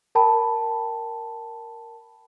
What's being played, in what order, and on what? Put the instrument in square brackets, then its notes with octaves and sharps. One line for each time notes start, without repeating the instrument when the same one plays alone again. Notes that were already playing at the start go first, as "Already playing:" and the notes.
[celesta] A#4 G5 A5 B5